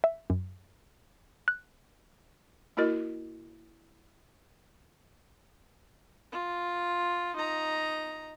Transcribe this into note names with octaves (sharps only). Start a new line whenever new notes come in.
E5
F#2
F#6
A#3 E4 F#4 A#4 D#5
F4
D#4 A#5